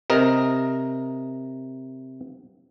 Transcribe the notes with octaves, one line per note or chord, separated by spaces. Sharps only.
C3 A#4 D#5